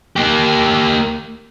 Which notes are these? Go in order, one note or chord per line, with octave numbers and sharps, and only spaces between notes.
A#3 G4